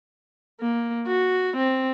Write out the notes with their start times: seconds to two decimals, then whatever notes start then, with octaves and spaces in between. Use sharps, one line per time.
0.61 A#3
1.07 F#4
1.57 C4